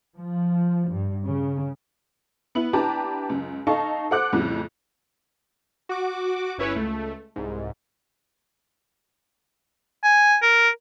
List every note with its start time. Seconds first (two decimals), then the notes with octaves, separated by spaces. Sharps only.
0.18 F3
0.89 G2
1.26 C#3
2.55 B3 E4 B4 F#7
2.73 D4 E4 G4 B4 A5 A#5
3.29 C#2 F#2
3.67 D#4 A4 F5 A5 C#6
4.11 A4 C5 F#5 D6 F#6
4.32 F2 A2 C#3 G3
5.89 F#4 D6
6.58 G1 C#4 E4 B4 C#5
6.76 C#2 A3
7.36 C2 G#2
10.04 G#5
10.42 A#4